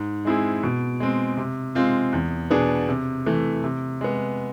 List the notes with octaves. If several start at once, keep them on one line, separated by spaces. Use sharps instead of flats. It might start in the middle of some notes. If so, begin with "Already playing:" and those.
Already playing: G#2
G#3 C4 E4 G#4
B2
G#3 C4
C3
G#3 C4 F4
E2
B2 B3 D4 G#4
C3
E3 A3
C3
G#3 B3